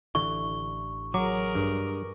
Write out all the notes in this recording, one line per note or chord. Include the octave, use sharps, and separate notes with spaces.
A1 D3 E3 C#6
F#3 G#4 A#4 D6
G2